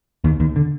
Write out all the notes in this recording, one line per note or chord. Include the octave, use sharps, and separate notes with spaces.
D#2 D#3
D#2 D#3
D3